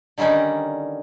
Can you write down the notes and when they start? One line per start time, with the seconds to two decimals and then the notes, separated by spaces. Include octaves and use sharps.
0.18 D3 D#3 G3 C#4 D#4